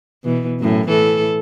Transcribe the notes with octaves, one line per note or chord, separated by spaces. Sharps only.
B2 E3
F#2 A2
A2 E3 A4